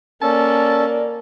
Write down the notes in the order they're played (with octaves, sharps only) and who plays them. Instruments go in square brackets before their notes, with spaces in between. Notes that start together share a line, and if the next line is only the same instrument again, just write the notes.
[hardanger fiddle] A#3 [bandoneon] C#4 A4 [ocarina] D5 [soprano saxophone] A5